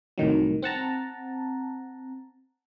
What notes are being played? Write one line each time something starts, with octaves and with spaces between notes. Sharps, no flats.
C2 A2 D#3 F#3
C4 F#5 A5 A#5